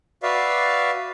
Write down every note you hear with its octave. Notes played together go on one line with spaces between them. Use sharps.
F#4 B4 D5 E5 F5